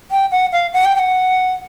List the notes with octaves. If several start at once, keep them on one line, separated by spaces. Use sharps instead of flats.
G5
F#5
F5
F#5
G5
G5
F#5